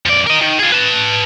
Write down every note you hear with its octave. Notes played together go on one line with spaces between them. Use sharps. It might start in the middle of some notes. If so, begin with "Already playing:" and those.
F2 D5
A#4 D#5
D#3
F4 G#4
B4 A5